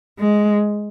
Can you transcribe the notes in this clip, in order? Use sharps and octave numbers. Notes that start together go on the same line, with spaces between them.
G#3